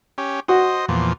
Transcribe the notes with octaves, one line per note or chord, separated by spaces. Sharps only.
C#4 G4
F#4 C5 D#5
E2 A#2 F3